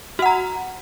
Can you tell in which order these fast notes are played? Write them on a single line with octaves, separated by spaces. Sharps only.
F#4 F#5 A#5